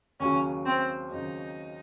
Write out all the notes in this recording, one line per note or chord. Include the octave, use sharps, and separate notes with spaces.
D#2 C#3 F#3 C#4
C4
D#2 C#3 F#3 D#4